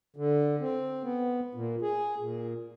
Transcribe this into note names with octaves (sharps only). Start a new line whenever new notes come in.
D3
C4
B3
A#2
G#4
A#2